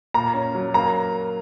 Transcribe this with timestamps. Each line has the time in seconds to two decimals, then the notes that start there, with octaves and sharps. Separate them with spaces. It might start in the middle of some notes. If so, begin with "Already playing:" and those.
0.14 A#2 A#5
0.34 C#4
0.55 F#3
0.74 A#3 A#5